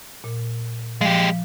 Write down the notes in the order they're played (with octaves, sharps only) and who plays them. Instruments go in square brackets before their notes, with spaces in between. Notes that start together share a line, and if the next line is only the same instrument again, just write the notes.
[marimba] A#2
[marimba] F3 [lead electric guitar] G#3 G4